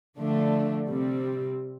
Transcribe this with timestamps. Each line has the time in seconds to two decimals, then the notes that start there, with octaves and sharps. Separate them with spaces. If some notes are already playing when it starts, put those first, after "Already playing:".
0.18 D3 F3 A3 D4
0.88 C3 G3 C4